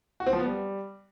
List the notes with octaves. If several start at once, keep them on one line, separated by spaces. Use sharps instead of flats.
F#4
C4
F3
B3
G3